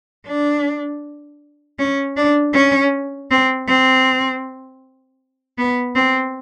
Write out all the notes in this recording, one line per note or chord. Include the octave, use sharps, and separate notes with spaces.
D4
C#4
D4
C#4
C4
C4
B3
C4